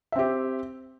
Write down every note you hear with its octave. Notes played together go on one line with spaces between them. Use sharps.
C4 G4 E5